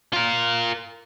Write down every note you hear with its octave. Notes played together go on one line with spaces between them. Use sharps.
F4 A#4